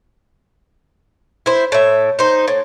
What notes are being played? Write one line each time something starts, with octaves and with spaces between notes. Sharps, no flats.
E4 C5
A2 E5
D#4 C5
A2